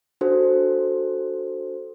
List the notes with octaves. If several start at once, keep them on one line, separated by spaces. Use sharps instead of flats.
D4 F#4 A4 C5